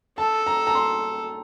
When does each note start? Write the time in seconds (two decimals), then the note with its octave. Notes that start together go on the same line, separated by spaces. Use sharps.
0.18 A4 A5
0.47 A#5
0.67 A#5
0.75 C6